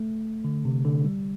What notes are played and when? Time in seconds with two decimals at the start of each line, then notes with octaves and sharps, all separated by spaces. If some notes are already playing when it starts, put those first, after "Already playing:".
Already playing: A3
0.45 D3
0.65 C3
0.85 D3
1.05 G3